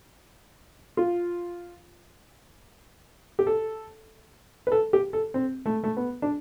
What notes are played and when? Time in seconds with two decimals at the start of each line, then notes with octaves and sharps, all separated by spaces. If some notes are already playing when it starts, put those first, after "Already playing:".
0.97 F4
3.39 G4
3.47 A4
4.67 B4
4.72 A4
4.93 G4
5.13 A4
5.34 C4
5.66 A3
5.84 A3
5.97 B3
6.22 D4